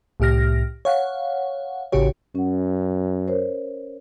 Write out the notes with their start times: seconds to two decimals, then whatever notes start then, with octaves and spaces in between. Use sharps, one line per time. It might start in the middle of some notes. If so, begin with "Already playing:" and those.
0.20 C2 A2 G4 F6 A#6
0.85 C#5 F5 F#5
1.92 A1 C#3 F#4 G4 C#5
2.35 F#2 C#4 F#5
3.27 A#4 C5 C#5